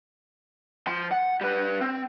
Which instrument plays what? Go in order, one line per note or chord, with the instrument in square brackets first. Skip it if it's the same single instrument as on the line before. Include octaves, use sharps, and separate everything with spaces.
[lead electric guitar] F3 C6
F#5
G3 B4
C4